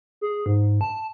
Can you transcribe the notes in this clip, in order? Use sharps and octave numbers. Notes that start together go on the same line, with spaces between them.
G#4
G#2
A5